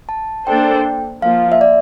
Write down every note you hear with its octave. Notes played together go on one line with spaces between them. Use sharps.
A5
A#3 D4 A4 C5 G5
F3 A#3 F4 F5
E5
D5